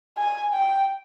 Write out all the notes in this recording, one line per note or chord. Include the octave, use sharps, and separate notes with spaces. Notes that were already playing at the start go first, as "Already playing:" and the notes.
G#5
G5